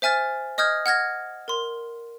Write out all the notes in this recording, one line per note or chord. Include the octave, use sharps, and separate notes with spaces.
C5 E5 G#5 F6 A6
D#5 D#6 F6 G6 G#6
F#5 F6 G#6 A#6
A#4 C6